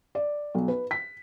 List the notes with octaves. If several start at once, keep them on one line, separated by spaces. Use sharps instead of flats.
D5
B1
B4
B6